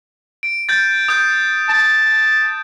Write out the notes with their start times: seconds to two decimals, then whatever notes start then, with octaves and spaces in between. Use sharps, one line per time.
0.43 D7
0.69 G6 A6
1.08 D#6 G6
1.69 A5